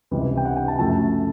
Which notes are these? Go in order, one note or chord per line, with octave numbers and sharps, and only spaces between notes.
C#2 C3 E3 G3
G5
F#5
G5
A5
F#2 C#3 F3 A3 A5